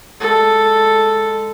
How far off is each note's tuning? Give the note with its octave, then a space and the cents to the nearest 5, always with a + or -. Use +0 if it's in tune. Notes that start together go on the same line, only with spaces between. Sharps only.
G#3 +0 A4 +0